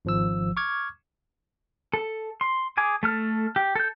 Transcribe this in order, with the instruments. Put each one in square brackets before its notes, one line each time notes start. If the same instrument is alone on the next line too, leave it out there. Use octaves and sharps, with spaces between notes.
[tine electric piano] G#1 F3 E6
C#6 D6 F6 G#6
[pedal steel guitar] A4
C6
G#4 G#5 D6
A3 A4 F6
G4
A4 G6